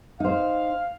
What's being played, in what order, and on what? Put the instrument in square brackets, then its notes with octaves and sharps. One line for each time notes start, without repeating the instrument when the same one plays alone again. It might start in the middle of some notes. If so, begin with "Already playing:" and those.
[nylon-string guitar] D#4 C5 [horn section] F5